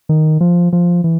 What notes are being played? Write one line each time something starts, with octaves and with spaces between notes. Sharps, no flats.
D#3
F3
F3
E3